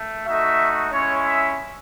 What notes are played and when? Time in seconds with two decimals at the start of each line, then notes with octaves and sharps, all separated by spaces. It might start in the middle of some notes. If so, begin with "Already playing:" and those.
Already playing: A3
0.26 A3 D#4 F#4 E5
0.92 G#3 C#4 E4 C#5
1.25 E5